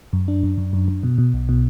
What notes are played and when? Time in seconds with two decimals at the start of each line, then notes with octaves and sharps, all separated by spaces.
0.13 F#2
0.28 D4
0.43 F#2
0.58 F#2
0.73 F#2
0.88 F#2
1.03 B2
1.18 B2
1.34 B1
1.49 B2